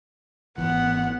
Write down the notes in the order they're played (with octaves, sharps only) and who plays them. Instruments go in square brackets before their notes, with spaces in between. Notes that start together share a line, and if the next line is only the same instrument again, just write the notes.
[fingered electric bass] G#1 E3 [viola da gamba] B3 [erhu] F#5